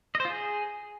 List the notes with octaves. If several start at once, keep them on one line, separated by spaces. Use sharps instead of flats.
D#5
C5
F4
G#4